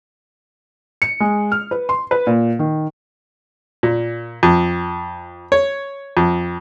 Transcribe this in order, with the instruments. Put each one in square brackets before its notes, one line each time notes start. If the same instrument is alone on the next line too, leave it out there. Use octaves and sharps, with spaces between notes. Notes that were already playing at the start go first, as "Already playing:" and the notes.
[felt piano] C#7
G#3
F6
B4
C6
B4
A#2
D#3
[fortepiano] A#2
F2
C#5
F2